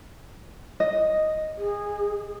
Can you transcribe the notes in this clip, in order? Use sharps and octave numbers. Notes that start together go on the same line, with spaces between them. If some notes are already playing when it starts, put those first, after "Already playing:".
D#5
G#4